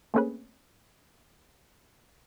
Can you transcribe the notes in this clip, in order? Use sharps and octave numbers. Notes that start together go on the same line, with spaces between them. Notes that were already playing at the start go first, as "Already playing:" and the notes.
A3 A#3 C4 C#4 G#4 B4